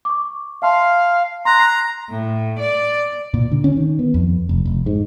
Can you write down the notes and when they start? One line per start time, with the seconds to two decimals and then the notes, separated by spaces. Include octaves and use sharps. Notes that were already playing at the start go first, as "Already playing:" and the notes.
0.05 C#6 D6
0.62 E5 F5 A5 C6
1.45 A#5 C6 F#6
1.60 F#6 C7
2.09 A2
2.58 D5
3.34 A#2
3.52 D3
3.64 C#4
3.77 D#3
3.99 B3
4.14 F2
4.49 F1
4.65 F1
4.86 G#2